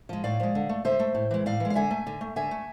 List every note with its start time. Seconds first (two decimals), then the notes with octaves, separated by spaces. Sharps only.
0.09 F3 G#3
0.24 A2 D5 F5
0.40 F3 G#3
0.55 D3
0.69 A3
0.85 D3 C5 E5
0.99 A3
1.15 A2
1.31 E3 G#3
1.46 A2 D5 F5
1.60 E3 G#3
1.70 F5
1.75 D3 E5 G#5
1.91 A3
2.07 D3
2.21 A3
2.36 D3 E5 G#5
2.51 A3